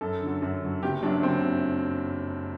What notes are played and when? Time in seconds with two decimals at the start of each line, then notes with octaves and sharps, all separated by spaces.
0.01 F#2 A4
0.21 D3 F#3
0.42 F#2
0.62 D3 F#3
0.83 F#1 G4
1.03 F#2 F#3 D4
1.23 F#1 C4